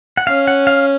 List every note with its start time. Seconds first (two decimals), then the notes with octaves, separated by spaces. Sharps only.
0.17 F#5
0.27 C#4 F5
0.47 F#5
0.67 F5